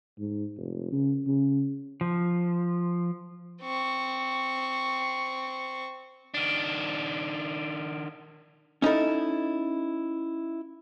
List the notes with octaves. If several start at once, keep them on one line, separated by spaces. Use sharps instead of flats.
G#2
F1
C#3
C#3
F3
C4 C#6
D#3 D4
C#4 D#4 E4 A4